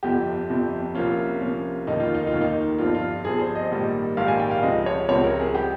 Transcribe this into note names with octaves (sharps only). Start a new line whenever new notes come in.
G1 F2 C3 F3 G4
G1 F2 C3 F3
C2 C3 F3 A#3 C#4 F4
C2 C3 F3 A#3 C#4
F1 D#2 D#3 A#3 D#4
F4
D#4
F4
F1 D#2 D#3 A#3
D#4
G1 G2 F3 C4 F4
F4
G1 G2 F3 C4 G#4
C5
D#5
A#1 G#2 D#3 G3 A#3
A#1 G#2 D#3 G3 A#3 F5
G#5
G5
F5
C#2 C3 F3 G#3 C4 D#5
C#5
C#2 C3 F3 G#3 C4 C#5
A#4
G#4
G3 G4